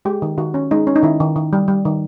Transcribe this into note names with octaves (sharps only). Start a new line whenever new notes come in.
G#3 G4
D#3
D#3 F#4
C#4
G#3 D#4
C#4
D#4
D#3 E4
D#3
D#3
G3
G3
D#3